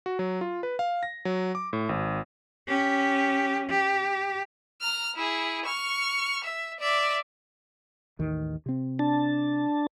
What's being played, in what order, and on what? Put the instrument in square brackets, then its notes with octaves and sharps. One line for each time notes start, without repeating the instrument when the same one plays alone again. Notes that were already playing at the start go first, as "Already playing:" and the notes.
[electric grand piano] F#4
F#3
F4
B4
F5
A#6
F#3
D6
A2
G#1
[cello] C#4 G4
G4
[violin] A#5 F6
E4 G#4
C#6 F6
E5
D5 E5
[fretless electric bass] A1 D#2 D#3
C3 C4
[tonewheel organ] D4 A5